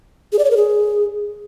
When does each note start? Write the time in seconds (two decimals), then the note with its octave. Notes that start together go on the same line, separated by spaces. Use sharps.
0.33 G#4
0.39 D5
0.45 C#5
0.51 A#4
0.57 G#4